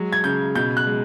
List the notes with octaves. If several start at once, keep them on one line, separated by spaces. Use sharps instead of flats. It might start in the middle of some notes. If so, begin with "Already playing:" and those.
Already playing: F#3 G#3
G#6
C#3 G6
B2 G6
F#6
G#3